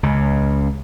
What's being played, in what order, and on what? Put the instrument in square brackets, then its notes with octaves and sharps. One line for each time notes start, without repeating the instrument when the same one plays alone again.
[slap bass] C#2 C#3